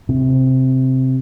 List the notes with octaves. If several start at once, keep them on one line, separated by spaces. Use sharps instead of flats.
C3